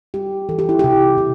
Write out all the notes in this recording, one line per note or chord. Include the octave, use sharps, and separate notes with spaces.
G3 G4
E3 A4
G4
E4
C3 G4
C3